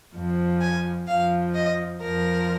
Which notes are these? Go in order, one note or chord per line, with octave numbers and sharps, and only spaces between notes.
F2 F3
G#5
F2 F3 F5
D#5
F2 F3 A#4